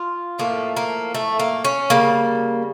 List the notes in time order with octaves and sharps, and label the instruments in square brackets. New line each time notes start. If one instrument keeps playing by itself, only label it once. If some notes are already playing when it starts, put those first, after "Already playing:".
Already playing: [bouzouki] F4
A2 F3 A3 A#3
A#3
A3
A#3
C#4
C#3 G3 A#3